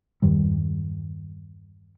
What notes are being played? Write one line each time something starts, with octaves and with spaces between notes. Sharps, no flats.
E2 G2 D#3 G3